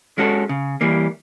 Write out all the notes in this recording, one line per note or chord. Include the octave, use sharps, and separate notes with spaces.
G#3 C#4 F#4 A4
C#3
E3 G3 A#3